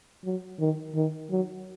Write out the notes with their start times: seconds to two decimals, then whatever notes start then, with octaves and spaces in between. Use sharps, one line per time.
0.24 F#3
0.59 D#3
0.95 D#3
1.30 F#3